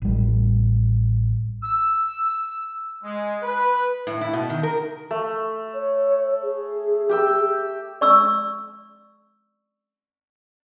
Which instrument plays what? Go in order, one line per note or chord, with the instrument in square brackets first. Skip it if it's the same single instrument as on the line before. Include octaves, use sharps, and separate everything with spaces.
[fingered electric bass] A1 G3
[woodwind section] E6
G#3
B4
[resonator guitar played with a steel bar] A2
E4
B2
D#3
A#4
[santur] A3
[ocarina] C#5
G#4
[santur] G4 G5 E6
[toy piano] D5 C#6 E6